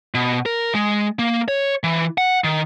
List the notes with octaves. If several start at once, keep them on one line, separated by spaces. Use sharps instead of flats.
B2
A#4
G#3
A#3
C#5
E3
F#5
D#3